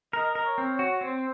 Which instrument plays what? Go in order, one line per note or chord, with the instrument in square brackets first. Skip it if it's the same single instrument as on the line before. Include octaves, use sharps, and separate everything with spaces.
[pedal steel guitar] A#4 [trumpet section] D#5
[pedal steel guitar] A#4
[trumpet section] C#5
[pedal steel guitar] C4
[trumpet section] C#5
[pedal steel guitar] F#4
[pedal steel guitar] C4 [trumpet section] C5